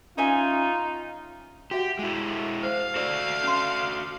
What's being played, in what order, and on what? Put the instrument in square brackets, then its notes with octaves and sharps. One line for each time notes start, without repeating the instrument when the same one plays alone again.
[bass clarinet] C#4 [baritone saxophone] D#4 [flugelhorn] F4 [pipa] C#5 E5 G#5
[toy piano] F#4 E5 F#5 [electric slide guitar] G4
[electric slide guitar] G#3 E4
[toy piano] G#4 C5 [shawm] F5
[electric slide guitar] F#4 A4 D5
[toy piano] C#4 C6